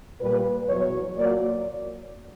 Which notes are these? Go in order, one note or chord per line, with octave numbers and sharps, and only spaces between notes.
A#2 G3 B4
E2 B2 F#3 C#5
A#2 F#3 D5